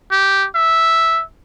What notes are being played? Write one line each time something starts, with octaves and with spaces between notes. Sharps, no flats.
G4
E5